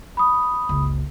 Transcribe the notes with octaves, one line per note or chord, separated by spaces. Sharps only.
B5 D#6
F#1 C#2